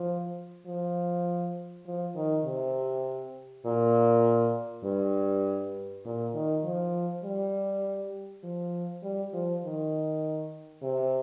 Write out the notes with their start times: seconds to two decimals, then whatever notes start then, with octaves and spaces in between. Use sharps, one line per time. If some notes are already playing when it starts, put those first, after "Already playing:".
Already playing: F3
0.66 F3
1.86 F3
2.15 D#3
2.45 C3
3.65 A#2
4.84 G2
6.05 A#2
6.34 D#3
6.64 F3
7.24 G3
8.44 F3
9.03 G3
9.33 F3
9.64 D#3
10.83 C3